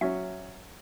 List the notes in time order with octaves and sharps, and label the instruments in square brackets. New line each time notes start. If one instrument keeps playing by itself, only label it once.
[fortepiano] F#3 C#4 [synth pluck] E5